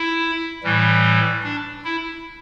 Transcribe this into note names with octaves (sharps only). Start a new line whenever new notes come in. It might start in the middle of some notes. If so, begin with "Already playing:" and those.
Already playing: E4
A2 E3 G3
D4
E4